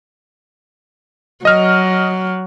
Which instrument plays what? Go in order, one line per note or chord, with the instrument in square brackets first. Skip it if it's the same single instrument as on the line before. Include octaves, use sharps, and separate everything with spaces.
[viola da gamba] F#3 [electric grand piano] D#5 F6